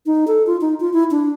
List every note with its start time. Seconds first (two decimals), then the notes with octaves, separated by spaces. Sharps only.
0.06 D#4
0.27 A4
0.47 F4
0.61 D#4
0.80 F4
0.93 E4
1.11 D4